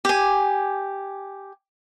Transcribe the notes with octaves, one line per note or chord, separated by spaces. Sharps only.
G4 G#5